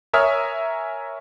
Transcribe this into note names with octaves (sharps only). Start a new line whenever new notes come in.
A#4 C#5 E5 G#5 D#6 F6